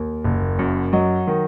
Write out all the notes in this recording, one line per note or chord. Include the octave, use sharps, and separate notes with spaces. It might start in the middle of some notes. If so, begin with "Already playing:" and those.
Already playing: D#2
F#1
F#2
F#3 D#5
D#3